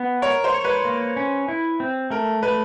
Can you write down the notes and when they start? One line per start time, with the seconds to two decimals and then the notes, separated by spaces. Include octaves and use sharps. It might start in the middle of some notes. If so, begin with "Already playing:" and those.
Already playing: B3
0.22 A#4 C#5
0.44 C5
0.54 C#5
0.64 B4
0.85 A#3
1.17 C#4
1.48 E4
1.80 C4
2.10 A3 A#4
2.43 A3 B4